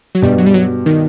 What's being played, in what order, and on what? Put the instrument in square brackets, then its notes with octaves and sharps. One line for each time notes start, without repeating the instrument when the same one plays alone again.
[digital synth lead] F#3
[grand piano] G2 B2 [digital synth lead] G3
[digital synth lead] F#3
G3
F#3
D#3